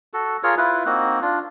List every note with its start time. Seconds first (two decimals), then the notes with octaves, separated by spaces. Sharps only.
0.13 F#4 A4
0.43 F4 G#4 A#4 C#5
0.57 E4 F4 B4
0.86 A#3 C4 D#4 F#4
1.22 D4 F4